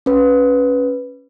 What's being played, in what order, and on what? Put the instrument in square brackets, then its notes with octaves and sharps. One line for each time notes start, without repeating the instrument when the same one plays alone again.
[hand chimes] C#4 B4